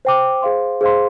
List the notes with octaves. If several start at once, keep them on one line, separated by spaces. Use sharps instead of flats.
C5 G5 D6
G#4 C5 F5 C6
G#4 C5 F5 C6